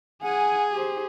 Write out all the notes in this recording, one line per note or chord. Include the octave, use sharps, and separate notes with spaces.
G#4 F#5 G#5
G4 C5